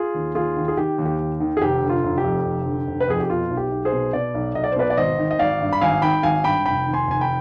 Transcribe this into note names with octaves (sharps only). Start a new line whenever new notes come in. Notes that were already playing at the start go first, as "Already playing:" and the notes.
Already playing: F4 G#4
D#2
D#2 F4 G#4
D#3
G#4
D#3 G4
D#2
G4
D#2
D#3
G#4
F1 G4
D3
F4
F1
G4
F2
F1
D3
F1
B4
F2 G#4
G4
B2 F4
B1
G4
B1
G#4 C5
B2
B2 B4 D5
B1
B1 D#5
D5
C5
B2 B4 D5
D5
G#1 C5 D#5
D#3
D#5
G#1 D5 F5
G2
B5
G#1 F5 G#5
D#3 G5 B5
G#1 F5 G#5
G2 G5 B5
F1 G5 B5
D#3
G#5 C6
F1 G#5
G5 B5